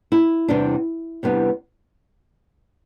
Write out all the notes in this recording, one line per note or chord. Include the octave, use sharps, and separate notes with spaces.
E4
E2 C3 G3 B3 D4
E2 C3 G3 B3 D4